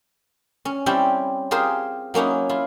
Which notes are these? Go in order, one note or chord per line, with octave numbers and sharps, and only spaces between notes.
C#4
G3 C4 C#4 E4 G4
F4 G4 G#4 A#4 C5
F#3 A#3 C#4 D#4 E4
E4 F4